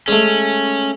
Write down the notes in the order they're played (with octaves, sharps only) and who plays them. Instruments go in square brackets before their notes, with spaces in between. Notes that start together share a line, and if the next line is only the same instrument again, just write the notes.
[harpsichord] G#3 A3 [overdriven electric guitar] C#4